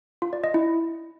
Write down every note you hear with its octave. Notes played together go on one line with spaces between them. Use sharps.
F4
D5
D#5
E4